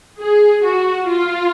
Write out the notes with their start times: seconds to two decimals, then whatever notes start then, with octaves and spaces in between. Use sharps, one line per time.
0.19 G#4
0.63 F#4
1.08 F4